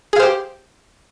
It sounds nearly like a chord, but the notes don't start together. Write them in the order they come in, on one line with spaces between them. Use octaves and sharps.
G#4 F5 C5 G4